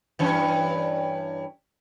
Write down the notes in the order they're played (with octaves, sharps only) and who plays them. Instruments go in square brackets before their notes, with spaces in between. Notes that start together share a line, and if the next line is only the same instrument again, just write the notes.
[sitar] G2 E3 C#4